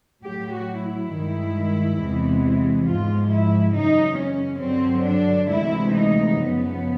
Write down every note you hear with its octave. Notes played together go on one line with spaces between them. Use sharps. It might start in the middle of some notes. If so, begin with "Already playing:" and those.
A2 F#3 G4
F#4
E4
G2 D#3 G#3
E2 C3 E3 G#3
G#2 F3 G#3 F4
E4
F#2 C#3 E3 D#4
C#4
G2 D3 F#3 C4
D4
D2 C3 E3 G#3 E4
D#4
F#2 C#3 F3 B3